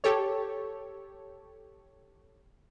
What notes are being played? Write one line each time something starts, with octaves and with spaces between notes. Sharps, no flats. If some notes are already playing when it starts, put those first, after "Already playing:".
G4 A4 C#5